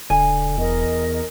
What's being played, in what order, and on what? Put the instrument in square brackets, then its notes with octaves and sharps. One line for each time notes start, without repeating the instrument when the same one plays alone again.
[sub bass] E1 [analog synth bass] D3 [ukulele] G#5
[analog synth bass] E2 [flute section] A#4 D#5